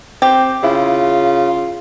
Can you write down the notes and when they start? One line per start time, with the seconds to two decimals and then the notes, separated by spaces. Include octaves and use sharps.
0.22 C4 G4
0.63 C#3 E4 F4